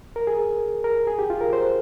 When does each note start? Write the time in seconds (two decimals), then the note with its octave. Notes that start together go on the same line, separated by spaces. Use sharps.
0.16 A#4
0.27 G#4
0.84 A#4
1.07 G#4
1.19 G4
1.30 F4
1.41 A#4
1.53 C5